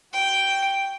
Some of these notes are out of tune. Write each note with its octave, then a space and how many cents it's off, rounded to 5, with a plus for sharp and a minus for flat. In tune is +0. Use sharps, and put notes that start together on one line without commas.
F#4 +15 G5 +0